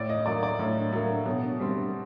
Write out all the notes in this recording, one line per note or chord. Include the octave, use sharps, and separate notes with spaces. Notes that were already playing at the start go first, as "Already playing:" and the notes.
Already playing: A2 D5
D#5
F#3 A#3 D5
D5
A2
F#3 A#3
B2
G3 C4